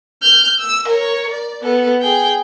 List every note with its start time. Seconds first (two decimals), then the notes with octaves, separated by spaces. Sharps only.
0.22 F6 G6
0.60 E6
0.88 A#4 C#5
1.31 D5
1.63 B3 A4
2.02 G#4 G5